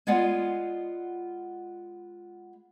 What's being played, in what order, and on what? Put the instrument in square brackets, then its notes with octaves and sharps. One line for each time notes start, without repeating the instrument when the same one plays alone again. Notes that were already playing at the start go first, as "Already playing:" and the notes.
[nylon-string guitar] G#3 B3 F4 D5 F#5 G#5